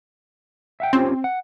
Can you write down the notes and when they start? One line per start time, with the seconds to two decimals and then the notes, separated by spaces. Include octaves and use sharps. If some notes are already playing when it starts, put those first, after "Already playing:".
0.80 E5 F#5 G5
0.93 C4 C#4 F4 G4
1.24 F#5